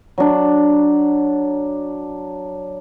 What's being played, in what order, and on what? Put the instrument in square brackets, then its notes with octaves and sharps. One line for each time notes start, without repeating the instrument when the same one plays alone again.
[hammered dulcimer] F#3 D4